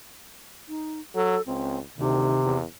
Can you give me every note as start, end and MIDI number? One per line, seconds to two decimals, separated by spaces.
0.69 1.00 63
1.15 1.36 54
1.15 1.42 69
1.47 1.82 37
1.47 1.79 60
1.97 2.33 38
1.97 2.58 48
1.97 2.49 51
2.44 2.64 40